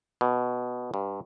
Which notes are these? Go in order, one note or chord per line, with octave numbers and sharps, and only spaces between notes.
B2
G2